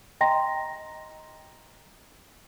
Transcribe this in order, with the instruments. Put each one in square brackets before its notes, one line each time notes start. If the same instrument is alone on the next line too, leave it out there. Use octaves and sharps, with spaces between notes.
[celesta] D#5 G5 A#5 C6 A#6